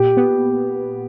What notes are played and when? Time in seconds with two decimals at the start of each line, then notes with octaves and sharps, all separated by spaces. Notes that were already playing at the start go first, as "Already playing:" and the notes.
Already playing: A#2 G4
0.17 B3